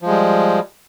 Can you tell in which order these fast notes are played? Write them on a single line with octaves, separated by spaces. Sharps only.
F3 G#3 G3